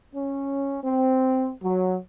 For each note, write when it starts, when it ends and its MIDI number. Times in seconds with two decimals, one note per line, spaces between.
0.13 0.77 61
0.83 1.51 60
1.62 1.97 54